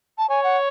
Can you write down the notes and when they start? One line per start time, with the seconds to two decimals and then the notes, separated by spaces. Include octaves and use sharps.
0.18 A5
0.29 C#5 G#5
0.44 F#5